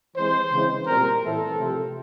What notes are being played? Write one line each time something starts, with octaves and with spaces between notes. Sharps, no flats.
E3 G#3 C4 C5
C#3 E3 G#3 C4
A#2 G3 C4 A#4
A2 E3 A3 C4 A4
C3 F3 A3 C4